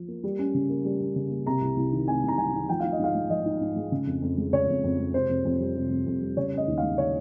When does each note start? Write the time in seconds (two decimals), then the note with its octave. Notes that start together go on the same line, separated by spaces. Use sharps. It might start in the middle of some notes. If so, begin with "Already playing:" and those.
Already playing: F3
0.08 A#3
0.23 G3
0.39 C#4
0.54 C#3
0.70 A#3
0.85 G3
1.01 C#4
1.16 C#3
1.31 A#3
1.46 C3 A#5
1.61 C2
1.76 C2
1.92 D#3
2.08 C3 G#5
2.23 C2
2.28 A#5
2.38 C2 G#5
2.53 D#3
2.69 F3 G5
2.80 D#4 F5
2.92 D#5
2.99 G#2 F5
3.15 G#3
3.30 F3 D#5
3.46 D#4
3.61 G#2
3.76 G#3
3.92 C#3
4.07 F2
4.22 F2
4.38 G#3
4.53 C#3 C#5
4.68 F2
4.84 F2
4.98 G#3
5.14 C3 C5
5.29 F2
5.45 F2
5.60 G3
5.75 C3
5.91 F2
6.06 F2
6.21 G3
6.37 C#3 C#5
6.52 C#4
6.57 D#5
6.68 D#2
6.78 F5
6.83 G#3
6.98 C#3 C#5